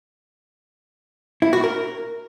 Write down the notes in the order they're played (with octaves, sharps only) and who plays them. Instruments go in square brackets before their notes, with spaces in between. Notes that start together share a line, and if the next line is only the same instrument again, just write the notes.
[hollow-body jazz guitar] E4
F#4
A#4